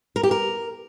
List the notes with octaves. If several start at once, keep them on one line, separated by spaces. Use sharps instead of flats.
A#4
G4
A#4